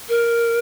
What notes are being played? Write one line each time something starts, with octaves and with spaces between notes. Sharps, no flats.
A#4